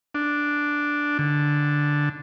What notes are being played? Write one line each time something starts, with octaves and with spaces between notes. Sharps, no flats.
D4
D3